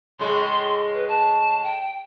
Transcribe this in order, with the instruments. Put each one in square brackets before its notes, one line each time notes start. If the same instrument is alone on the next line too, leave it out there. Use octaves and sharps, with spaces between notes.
[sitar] A2 C#3 G#3 [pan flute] C6
[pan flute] B4
A5
G5